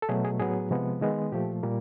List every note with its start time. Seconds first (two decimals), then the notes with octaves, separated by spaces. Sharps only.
0.02 A4
0.09 B2 F#3 A3 G#4
0.25 G#4
0.40 A2 F#3 B3 G#4
0.71 C3 F3 G#3 B3
1.01 D#3 G#3 B3
1.32 A#2 F3 A3 G4
1.63 A#2 G3 A#3